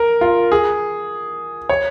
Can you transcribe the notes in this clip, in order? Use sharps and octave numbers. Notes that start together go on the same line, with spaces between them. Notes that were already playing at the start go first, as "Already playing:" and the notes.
Already playing: A#4
F4
G#4
C#5